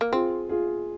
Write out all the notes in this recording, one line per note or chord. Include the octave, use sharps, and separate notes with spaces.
A#3
C4 F4 G#4
F4 G#4